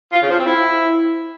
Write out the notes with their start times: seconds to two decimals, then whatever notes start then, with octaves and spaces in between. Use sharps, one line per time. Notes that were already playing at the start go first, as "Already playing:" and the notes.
0.12 F4
0.21 C#3
0.29 F3
0.37 C4
0.46 E4